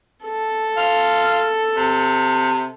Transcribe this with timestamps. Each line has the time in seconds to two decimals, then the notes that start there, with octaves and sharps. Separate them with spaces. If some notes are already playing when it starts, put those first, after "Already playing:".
0.24 A4
0.77 F4
1.76 C3